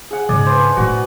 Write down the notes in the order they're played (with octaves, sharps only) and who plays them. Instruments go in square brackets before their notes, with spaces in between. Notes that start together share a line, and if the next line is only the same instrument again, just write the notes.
[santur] G#4 F#5
[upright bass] G#2 C#3 [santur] G#4 D5 D#5
[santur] B4 C5
D4
[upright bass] A2 E4 [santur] F#4